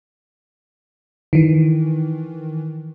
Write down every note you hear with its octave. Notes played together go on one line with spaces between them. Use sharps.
D#3 E3